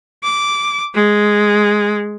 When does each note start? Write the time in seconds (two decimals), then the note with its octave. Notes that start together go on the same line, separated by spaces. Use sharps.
0.24 D6
0.95 G#3